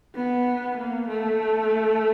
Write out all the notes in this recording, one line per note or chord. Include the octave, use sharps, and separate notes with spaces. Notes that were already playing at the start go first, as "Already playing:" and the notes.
B3
A#3
A3